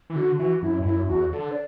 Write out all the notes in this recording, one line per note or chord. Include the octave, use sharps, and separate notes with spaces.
E3
D3 F#4
E3 F#4
F#2 E4
G2
F#2 E4
E2 F#4
D3 A4
D5